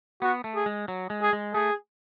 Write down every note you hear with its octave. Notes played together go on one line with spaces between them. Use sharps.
B3 F#4
A3
G#4
G#3
F#3
G#3
G#4
G#3
A3 G#4